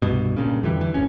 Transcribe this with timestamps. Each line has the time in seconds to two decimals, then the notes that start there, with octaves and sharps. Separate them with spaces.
0.02 C2 G2 B2
0.36 G2 A#2 C#3
0.63 F2 D3 E3 G3
0.81 E3
0.94 G#1 D2 C#4